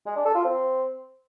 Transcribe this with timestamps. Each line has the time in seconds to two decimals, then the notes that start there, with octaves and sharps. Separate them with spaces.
0.06 G#3
0.16 D4
0.25 A4
0.35 F4
0.44 C4